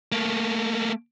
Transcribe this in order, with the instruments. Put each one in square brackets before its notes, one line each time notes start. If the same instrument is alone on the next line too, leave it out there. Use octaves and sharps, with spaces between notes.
[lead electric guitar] A3 A#3